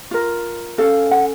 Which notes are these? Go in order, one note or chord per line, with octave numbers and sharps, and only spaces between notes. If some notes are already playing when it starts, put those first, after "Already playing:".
F4 A#4
C#4 A4 F5
F#5